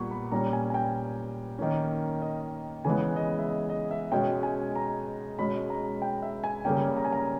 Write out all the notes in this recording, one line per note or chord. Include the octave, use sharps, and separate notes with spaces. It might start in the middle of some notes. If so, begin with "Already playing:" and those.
Already playing: A#2 G3 B3 C#6
B5
A#2 G3 C#4 A#5
G#5
G#5
G5
D#3 A#3 C#4
D#5
C#3 E3 G#3 B3 G#5
D#5
E5
D#5
D#5
E5
B2 G#3 C#4 G5
G#5
A#5
B2 G#3 C#4 B5
A#5
G5
E5
G#5
C#3 G3 A#3 C#4 G5
A#5
G#5
A#5